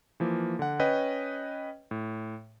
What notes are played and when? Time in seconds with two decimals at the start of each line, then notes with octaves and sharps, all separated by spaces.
0.20 E3 F3 A#3
0.59 D3 F#5
0.80 C#4 B4 C#5 D#5 G5
1.91 A2